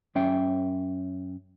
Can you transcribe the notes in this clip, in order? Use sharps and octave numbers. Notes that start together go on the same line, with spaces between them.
F#2 C#4 E5 G5